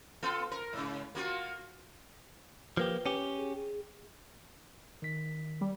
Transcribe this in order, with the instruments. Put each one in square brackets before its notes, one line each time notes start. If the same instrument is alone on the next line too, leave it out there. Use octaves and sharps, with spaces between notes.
[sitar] B3 F4 A4
A#4
G#2 C#3
A#3 F4 F#4
[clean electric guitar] F3 A#3 G4 [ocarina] B4
[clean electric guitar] C#4 G4
[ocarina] G#4
G#4
[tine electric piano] D#3 B6
[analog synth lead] G3